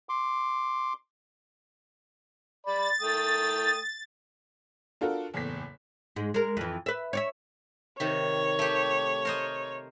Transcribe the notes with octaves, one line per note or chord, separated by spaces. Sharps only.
C6 D6
D5 B5 A6
A3 G5 D#6
D4 F4 F#4 A4 A#4
F#1 E2 A2 B6
G#2 G#3
G#3 A#4
F2 E3
B4 E5
C#5 D5 E5
C3 D#3 C#5
A3 G4
A#4 C5 D#5